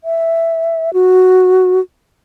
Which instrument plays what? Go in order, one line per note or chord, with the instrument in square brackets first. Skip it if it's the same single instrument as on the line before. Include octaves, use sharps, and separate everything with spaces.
[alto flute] E5
F#4